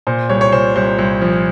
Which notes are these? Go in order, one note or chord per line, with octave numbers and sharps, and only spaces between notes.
A#2 C5
C2 C#5
C#5
A#2 C5
C2 C5
C2
F3